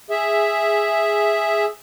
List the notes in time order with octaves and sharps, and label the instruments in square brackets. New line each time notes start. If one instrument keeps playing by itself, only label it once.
[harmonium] G#4 E5